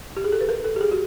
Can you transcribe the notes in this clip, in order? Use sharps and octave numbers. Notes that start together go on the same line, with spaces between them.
G4
G#4
A4
B4
A#4
A4
G4
G#4
F#4